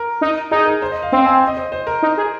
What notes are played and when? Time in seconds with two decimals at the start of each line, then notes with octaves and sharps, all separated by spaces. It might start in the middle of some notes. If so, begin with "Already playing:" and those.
Already playing: A#4
0.21 D#4
0.51 D#4 G#4
0.66 A#4
0.82 C5
0.92 D#5
1.02 F5
1.12 C4 F5
1.26 G#5
1.47 D#5
1.57 C5
1.72 C5
1.87 A#4
2.02 D#4
2.17 G#4